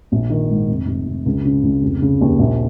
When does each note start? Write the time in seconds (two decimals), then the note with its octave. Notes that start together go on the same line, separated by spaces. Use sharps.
0.12 A#1
0.30 D#3
0.50 G#2
0.69 F1
0.87 F1
1.06 F1
1.26 C#2
1.45 C#3
1.63 C#2
1.82 F1
2.02 C#3
2.21 D#2
2.39 A#1